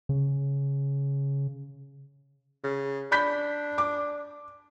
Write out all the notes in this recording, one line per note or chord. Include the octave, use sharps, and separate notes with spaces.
C#3
C#3
D4 B5 G6 B6
D6